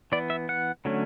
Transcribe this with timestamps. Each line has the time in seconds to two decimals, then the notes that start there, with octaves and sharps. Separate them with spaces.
0.12 E3 B3 D5
0.30 E5
0.49 F#5
0.85 D3 F#3 A3 C#4